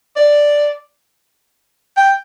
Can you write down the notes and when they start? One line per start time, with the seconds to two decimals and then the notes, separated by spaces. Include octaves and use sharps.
0.16 D5
1.97 G5